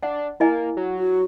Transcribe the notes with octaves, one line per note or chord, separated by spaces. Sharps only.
D4 F#5
A#3 E4 D#5 G#5
F#3
F#4